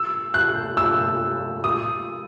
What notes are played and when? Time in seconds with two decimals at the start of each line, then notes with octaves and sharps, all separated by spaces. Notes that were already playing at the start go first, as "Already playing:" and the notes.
Already playing: E6
0.34 F#6
0.77 E6
1.64 D#6